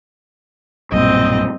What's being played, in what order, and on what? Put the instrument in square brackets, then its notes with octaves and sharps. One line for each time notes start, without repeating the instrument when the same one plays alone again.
[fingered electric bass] B1 G2 A#2 [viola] C4 D#5